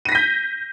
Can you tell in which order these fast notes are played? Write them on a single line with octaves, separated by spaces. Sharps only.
D#7 A#6 B6 G6